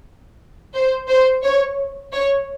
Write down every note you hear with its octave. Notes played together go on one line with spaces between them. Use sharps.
C5
C5
C#5
C#5